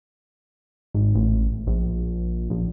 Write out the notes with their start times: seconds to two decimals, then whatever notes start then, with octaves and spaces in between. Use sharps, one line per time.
0.94 G#1
1.15 A1
1.67 A#1
2.50 A#1